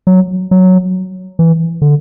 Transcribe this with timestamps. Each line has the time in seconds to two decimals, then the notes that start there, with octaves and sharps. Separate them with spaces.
0.07 F#3
0.51 F#3
1.39 E3
1.82 D3